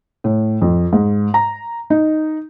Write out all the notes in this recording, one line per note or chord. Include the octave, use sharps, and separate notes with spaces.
A2
F2
G#2
A#5
D#4